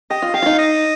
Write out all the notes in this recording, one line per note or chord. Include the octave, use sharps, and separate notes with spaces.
G4 D#5
F4
G4 F5
F4
D#4
D#5